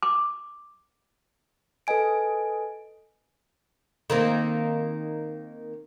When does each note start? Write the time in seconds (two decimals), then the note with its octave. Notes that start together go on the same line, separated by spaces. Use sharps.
0.03 D6
1.87 A4 B4 D#5 G#5 D7
4.10 D#3 A#3 C4